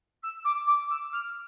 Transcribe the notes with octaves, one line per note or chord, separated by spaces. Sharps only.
E6
D6
D6
E6
F6